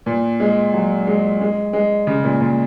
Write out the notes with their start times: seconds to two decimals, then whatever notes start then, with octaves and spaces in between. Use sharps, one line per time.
0.06 A#2
0.40 G#3
0.74 F#3
1.07 G#3
1.41 G#3
1.73 G#3
2.07 C#3
2.24 A#2
2.41 A#2